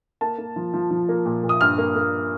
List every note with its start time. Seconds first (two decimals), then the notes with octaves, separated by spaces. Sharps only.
0.21 A#3 A5
0.38 A#3
0.56 F3
0.74 F3
0.91 F3
1.09 A#3
1.26 A#2
1.43 A#2
1.49 D#6
1.61 G2 F6
1.78 A#3
1.95 A#3